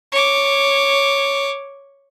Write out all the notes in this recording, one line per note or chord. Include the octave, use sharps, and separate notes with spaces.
C#5 D6